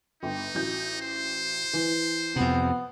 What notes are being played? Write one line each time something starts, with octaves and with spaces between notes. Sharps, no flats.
G1 D#4 G5
A1 F#4 G6
C5
E3
F2 C3 B3